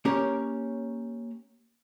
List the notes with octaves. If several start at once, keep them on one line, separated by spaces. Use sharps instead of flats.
A#3 C#4 G4 A#4 C#5